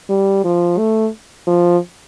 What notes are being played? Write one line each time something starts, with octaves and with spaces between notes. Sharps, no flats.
G3
F3
A3
F3